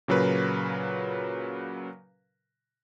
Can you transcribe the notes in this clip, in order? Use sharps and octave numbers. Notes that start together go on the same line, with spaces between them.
A#2 C#3 F#3 A#4 B4